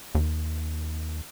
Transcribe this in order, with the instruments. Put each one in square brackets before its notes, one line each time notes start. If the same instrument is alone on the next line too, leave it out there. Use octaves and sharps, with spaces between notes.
[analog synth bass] D#2